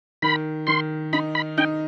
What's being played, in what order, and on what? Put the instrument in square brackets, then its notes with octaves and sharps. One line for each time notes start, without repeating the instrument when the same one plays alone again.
[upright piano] D#3 [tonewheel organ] B5
[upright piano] D#3 [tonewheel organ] C6
[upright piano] D#4 [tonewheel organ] B5
[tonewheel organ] B5
[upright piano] D#4 [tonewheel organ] G5